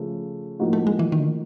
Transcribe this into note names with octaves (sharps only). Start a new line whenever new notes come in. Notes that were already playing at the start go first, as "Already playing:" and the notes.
Already playing: C#3 F3 A3
A2 F3 A#3 D#4 F#4
A3
G#3
E3
D#3
D3
D#3